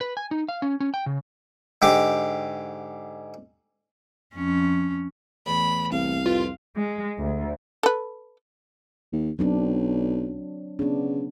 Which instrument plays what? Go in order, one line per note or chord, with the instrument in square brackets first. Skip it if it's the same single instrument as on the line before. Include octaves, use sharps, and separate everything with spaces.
[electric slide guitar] B4
G#5
D#4
F5
C#4
C#4
G5
C#3
[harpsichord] G#2 D3 G4 D6
[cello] F2 C#4
[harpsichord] A1 E2 [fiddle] B5
[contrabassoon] C2 [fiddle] F5
[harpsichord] F2 B4 [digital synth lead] F4
[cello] G#3
D2
[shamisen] A4 B4
[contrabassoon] D#2
[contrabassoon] B1 [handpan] F#3 C4 D4
[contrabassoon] C#3 [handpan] B3 D4